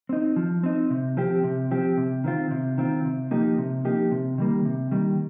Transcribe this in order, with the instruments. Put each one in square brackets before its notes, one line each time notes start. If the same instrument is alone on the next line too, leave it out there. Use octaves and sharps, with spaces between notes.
[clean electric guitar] C4 D#4
F3
C4 D#4
C3
F3 C4 G4
C3
F3 C4 G4
C3
D#3 C4 F4
C3
D#3 C4 F4
C3
F3 A#3 D#4 G4
C3
F3 A#3 D#4 G4
C3
D#3 G3 A#3
C3
D#3 G3 A#3